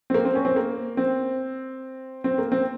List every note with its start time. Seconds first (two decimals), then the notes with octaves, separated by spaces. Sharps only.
0.10 C4
0.14 A#3
0.25 C4
0.35 C#4
0.45 C4
0.56 A#3
0.97 C4
2.24 C4
2.38 A#3
2.52 C4